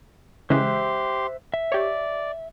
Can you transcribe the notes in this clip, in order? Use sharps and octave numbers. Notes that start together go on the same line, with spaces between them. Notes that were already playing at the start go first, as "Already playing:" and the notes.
C#3 E3 G#3 G4 C5 E5 C6 F#6
E5
G4 C#5 D5